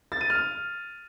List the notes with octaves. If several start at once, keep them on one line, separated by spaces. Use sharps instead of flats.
A6
D#7
F6